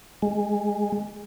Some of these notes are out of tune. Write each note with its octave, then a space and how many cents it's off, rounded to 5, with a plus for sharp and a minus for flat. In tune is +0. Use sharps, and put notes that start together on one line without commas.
G#3 -5